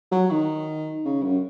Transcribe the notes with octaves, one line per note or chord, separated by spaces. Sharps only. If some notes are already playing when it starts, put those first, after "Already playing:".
F#3
D#3
C#3
F#2